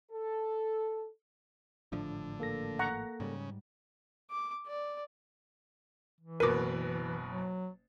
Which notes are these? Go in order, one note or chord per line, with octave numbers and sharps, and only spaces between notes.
A4
G#1 A2 D3 F3 D4
A#3 A4 A#6
F#5 A#5 C#6
G#2 C#3 G3
D6
D5
E3
F#1 B2 A#4 B4 D6
F#3